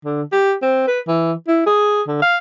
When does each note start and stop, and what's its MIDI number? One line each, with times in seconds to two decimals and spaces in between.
0.05 0.22 50
0.32 0.54 67
0.62 0.83 60
0.88 1.00 71
1.08 1.33 52
1.48 1.64 64
1.66 2.02 68
2.07 2.18 50
2.22 2.37 77